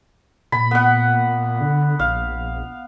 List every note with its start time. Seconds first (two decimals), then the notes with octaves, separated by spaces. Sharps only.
0.52 A#2 B5
0.71 B3 F#5
1.60 D3
1.99 A#1 F5